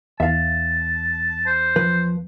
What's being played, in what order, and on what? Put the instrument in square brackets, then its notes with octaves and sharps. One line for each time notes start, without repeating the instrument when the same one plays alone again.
[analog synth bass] E2 [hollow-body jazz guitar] E5 F5 [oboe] A5
[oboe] C5
[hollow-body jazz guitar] F3 B4